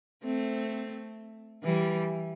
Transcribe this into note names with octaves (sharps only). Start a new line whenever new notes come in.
A3 C4
E3 G3